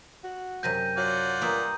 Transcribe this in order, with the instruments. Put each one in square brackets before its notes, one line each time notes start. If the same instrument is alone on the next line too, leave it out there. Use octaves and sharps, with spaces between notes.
[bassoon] F#4
[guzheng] F#2 C3 G#5 [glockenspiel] G6 A#6 D#7
[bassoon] F#3 [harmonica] F4 D5 F#5 [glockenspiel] G6
[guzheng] G2 A#3 E5 [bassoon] A#2 [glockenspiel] A#5 D#6 G6